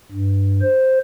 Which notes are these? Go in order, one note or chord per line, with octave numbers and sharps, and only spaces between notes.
G2
C5